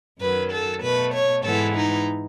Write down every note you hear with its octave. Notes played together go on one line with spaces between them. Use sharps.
F#2 D#3 F#3 B4
A4
B2 A3 B4
C#5
G#2 E3 G#3 B3 A4
D#4